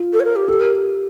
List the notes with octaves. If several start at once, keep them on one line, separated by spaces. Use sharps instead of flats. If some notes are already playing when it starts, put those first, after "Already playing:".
Already playing: F4
A4
C#5
A#4
G4
G4 A4
A#4